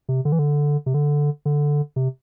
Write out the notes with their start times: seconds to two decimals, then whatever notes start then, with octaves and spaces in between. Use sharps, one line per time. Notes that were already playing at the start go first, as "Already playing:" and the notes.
0.09 C3
0.25 D3
0.32 E3
0.39 D3
0.86 C3
0.94 D3
1.45 D3
1.96 C3